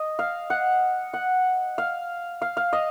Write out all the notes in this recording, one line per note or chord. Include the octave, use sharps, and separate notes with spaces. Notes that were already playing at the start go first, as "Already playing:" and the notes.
Already playing: D#5
F5
F#5
F#5
F5
F5
F5
D#5